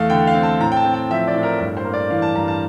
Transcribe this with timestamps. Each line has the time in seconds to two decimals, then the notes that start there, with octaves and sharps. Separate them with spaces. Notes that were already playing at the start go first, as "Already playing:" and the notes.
Already playing: E2 A3 F5
0.10 D3 G5
0.27 F5
0.34 C4
0.43 A5
0.60 A2 A#5
0.72 G5
0.76 A5
0.85 C4
0.94 G5
1.10 F3 E5
1.27 D5
1.35 A2
1.43 A#4
1.60 G2 A#4
1.77 C5
1.85 A#3
1.93 D5
2.10 E3 F5
2.22 A5
2.35 G2 A#5
2.48 A5